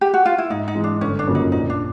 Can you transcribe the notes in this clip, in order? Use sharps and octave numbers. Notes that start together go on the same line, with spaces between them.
G4
F#4
F4
E4
G#2 D#4
D#4
E3 G#3
D4
G1 C#4
D4
F#2 C#3 F3 A#3
D#4
A#1 D#4
D4